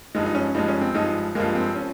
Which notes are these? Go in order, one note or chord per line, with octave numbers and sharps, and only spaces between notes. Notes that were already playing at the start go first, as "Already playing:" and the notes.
G2 F3 G#3 D#4
D#4
C#4
G2 F3 G#3 D#4
C#4
C4
G2 F3 G#3 D#4
G2 F3 G#3 A#3
C4
F3 C#4